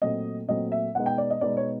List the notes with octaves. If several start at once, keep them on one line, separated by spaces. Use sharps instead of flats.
A#2 F#3 A3 C4 D#5
A#2 F#3 A3 C4 D#5
E5
B2 G#3 B3 D#4 F#5
G5
D5
D#5
B2 G#3 B3 D#4 D5
C#5